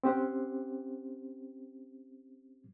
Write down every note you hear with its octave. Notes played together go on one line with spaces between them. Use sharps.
C4 C#4 G4 C5 F#5